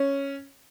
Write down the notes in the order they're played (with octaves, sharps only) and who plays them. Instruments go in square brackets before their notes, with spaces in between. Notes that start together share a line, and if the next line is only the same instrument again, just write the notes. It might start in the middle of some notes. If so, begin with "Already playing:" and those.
Already playing: [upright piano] C#4